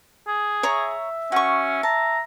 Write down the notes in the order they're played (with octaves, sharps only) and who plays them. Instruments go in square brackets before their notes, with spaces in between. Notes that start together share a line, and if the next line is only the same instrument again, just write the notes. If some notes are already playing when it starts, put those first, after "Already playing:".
[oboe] G#4
[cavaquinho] C#5 A#5 C#6 [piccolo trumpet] E5
[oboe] C#4 [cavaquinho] F#4 C#6
[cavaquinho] A5 [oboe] A#5